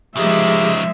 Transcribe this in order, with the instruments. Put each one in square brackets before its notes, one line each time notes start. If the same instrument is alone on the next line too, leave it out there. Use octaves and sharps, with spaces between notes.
[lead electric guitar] C#3 D#4 [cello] F3 G#3 [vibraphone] G4 G#4 D6 [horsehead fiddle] E5